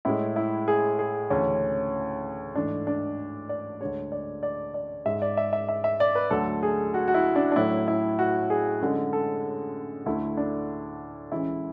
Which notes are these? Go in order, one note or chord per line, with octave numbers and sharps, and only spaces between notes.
A2 G#3 E4
E4
G#4
G#4
D2 C#3 E3 C#4
G#2 E3 A3 D4
D4
D5
D2 D3 G#3 C#5
D5
D5
D5
G#2 G#3 E5
D5
E5
E5
E5
E5
D5
B4
D2 D3 F#3 A3 A4
G#4
F#4
F#4
E4
D4
D4
A2 F#3 A3 E4
E4
F#4
G#4
F#2 D3 G#3
A4
D2 D3 A3 E4
D4
C#2 C#3 E3 G#3 E4